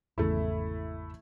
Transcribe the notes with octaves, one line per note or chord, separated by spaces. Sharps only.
G#1 E2 C#3 A3 E4